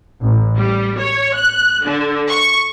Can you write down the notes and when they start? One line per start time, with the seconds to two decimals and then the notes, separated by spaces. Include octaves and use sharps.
0.22 A1
0.57 G3
0.98 C#5
1.36 F#6
1.84 D3
2.30 C#6